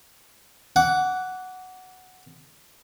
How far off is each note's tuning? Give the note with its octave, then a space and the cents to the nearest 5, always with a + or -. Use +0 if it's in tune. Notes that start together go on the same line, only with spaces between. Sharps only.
F#5 +0 D6 -30